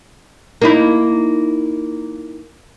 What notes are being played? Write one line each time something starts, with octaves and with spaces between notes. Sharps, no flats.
A#3 D#4 E4